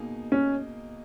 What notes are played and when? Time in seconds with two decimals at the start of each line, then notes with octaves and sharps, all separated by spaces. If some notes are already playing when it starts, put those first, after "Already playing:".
Already playing: B2 A#3 D#4 G#4
0.32 C#4